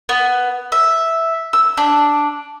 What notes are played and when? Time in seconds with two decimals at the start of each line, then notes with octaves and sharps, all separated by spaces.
0.09 B3
0.72 E5
1.53 E6
1.77 D4